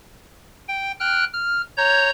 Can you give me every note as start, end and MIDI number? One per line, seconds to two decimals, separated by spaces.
0.68 0.92 79
1.00 1.25 79
1.00 1.25 89
1.00 1.25 90
1.34 1.62 89
1.77 2.10 73
1.77 2.10 82
1.77 2.10 91